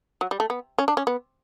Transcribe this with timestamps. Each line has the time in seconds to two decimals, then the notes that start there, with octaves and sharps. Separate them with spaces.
0.21 F#3
0.31 G3
0.40 A3
0.50 B3
0.78 C#4
0.88 D4
0.97 C#4
1.07 B3